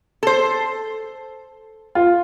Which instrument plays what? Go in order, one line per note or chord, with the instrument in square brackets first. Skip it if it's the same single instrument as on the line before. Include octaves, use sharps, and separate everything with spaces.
[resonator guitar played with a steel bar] A4 C5
[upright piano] F4